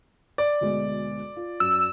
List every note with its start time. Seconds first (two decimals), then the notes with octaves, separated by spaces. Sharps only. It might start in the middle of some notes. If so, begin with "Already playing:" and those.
0.38 D5
0.61 D2 B2 G#3
1.36 F4
1.60 F#2 E6